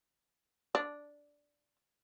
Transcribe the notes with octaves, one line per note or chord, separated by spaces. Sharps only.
D4